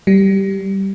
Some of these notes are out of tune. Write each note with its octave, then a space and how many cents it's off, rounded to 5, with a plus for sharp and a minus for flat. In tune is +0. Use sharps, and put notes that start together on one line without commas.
G3 -10